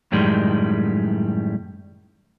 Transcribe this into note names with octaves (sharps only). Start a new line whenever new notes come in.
F#2 A2 D#3 G3 G#3